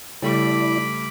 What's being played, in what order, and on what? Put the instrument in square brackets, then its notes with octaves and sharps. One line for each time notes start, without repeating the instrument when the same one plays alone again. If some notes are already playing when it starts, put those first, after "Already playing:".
[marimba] C#3 [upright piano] G3 A3 [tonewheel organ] E4 D5 [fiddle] B5 D6